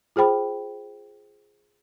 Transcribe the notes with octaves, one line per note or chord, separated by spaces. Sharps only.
F4 G#4 C5 G5 B5